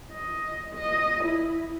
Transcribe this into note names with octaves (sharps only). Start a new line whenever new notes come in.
D#5
D#5
E4